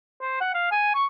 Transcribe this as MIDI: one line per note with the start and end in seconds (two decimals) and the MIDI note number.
0.21 0.39 72
0.41 0.54 78
0.55 0.67 77
0.72 0.92 80
0.95 1.06 85